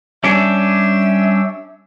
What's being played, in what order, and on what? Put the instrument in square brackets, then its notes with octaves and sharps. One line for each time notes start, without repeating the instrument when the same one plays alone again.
[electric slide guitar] G3 C#4 D4 [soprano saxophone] E5